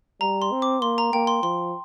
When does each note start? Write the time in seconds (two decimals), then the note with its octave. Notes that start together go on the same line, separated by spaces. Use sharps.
0.21 G3 A#5
0.42 C6
0.52 C4
0.62 D6
0.82 A#3 C6
0.98 A#5
1.13 A#3 G5
1.27 C6
1.43 F3 C6